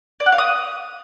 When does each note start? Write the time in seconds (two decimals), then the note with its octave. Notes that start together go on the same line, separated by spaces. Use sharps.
0.20 D5
0.26 F#5
0.32 F5
0.38 D#6